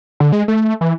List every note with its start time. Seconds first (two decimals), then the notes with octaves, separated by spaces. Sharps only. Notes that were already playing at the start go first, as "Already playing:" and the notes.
0.20 D3
0.32 G#3
0.48 A3
0.81 E3